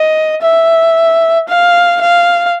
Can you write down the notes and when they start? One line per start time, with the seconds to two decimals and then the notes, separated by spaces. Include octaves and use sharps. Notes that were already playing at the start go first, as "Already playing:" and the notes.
Already playing: D#5
0.42 E5
1.48 F5
2.01 F5